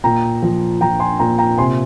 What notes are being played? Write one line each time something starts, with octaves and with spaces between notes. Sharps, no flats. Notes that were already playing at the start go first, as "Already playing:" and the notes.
A#2 G5 A#5
F3
F3 G5 A#5
G#5 C6
A#2 G5 A#5
G5 A#5
C3 G#5 C6